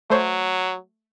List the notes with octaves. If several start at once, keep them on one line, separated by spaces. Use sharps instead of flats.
F#3 A3 C5 C#5